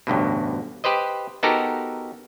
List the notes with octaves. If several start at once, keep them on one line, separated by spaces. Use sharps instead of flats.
A1 D2 G2 B2
G4 B4 C5 D#5
B3 D#4 F#4 G4 A4 A#4